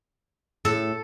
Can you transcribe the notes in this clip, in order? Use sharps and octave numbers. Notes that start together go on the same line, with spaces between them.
A2 A4